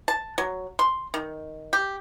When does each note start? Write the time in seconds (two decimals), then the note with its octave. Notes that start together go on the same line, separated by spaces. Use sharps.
0.08 A5
0.38 F#3
0.79 C6
1.14 D#3
1.73 G4